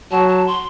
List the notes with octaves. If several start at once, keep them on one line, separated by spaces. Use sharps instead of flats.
F#3 A5
A5
C6